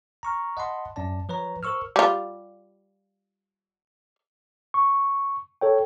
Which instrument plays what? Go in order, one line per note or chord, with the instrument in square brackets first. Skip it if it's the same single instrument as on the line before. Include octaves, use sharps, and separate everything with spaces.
[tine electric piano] A#5 C#6 F6
D#5 F#5 A5 B5 C6
F#2 C#4 D5 A5
F3 B4 C#5 A#5
A#4 C5 C#6 E6 F6
[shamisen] G3 F4
[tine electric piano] C#6
A4 C#5 G5